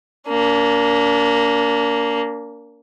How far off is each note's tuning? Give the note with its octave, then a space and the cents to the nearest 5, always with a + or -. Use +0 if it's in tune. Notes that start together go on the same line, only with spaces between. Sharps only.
A#3 +0 D4 -40